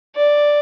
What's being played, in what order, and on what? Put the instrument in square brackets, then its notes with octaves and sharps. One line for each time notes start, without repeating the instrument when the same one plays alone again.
[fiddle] D5